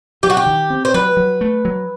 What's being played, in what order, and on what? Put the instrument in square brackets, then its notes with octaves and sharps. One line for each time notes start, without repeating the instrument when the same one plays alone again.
[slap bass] F#3 [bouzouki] G4
[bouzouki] F#4
G4
[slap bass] D#3
C4
[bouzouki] C5
[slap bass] F#3 [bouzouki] B4
[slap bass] F#3
A3
F#3